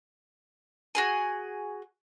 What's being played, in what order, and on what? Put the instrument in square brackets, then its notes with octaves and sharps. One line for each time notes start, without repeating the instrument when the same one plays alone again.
[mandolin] F#4 G#4 G#5